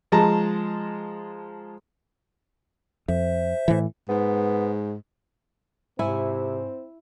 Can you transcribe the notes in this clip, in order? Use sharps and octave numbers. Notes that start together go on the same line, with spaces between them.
F3 G#3 A5 A#5
F2 C5 E5
A2 E3
G#2 B3
G#2 C3 C4 E4 C#5 G#5